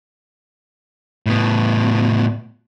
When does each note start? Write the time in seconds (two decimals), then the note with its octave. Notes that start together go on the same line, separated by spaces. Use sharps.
1.26 A2 B3